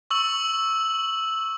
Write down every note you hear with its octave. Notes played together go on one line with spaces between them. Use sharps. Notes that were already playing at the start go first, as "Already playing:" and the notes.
C#6 E6 F#7